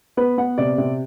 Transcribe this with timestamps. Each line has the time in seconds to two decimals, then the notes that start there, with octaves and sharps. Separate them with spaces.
0.17 B3 B4
0.38 B3 F#5
0.58 C3 D5
0.78 C3